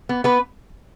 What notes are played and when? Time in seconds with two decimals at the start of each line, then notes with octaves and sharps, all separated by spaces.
0.09 B3
0.24 B3 B4